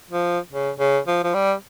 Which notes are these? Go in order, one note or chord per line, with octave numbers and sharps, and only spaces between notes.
F3
C#3
C#3
F3
F3
G3